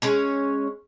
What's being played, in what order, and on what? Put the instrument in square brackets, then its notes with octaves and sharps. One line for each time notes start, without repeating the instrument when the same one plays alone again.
[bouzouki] G#3 C#4 C#5